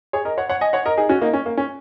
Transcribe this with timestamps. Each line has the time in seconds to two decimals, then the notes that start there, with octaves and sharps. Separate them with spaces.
0.13 G#4 C#5
0.25 A#4 D#5
0.38 C#5 F#5
0.49 C#5 F#5
0.61 D#5 G#5
0.73 C#5 F#5
0.85 A#4 D#5
0.97 D#4 G#4
1.09 C#4 F#4
1.21 A#3 D#4
1.33 C#4
1.46 A#3
1.57 C#4